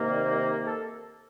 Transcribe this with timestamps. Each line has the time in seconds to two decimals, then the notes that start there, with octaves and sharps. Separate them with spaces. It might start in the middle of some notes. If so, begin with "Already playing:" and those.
Already playing: C3 D#3 A#3
0.09 D5
0.23 C5
0.38 C5
0.52 A#4
0.67 A4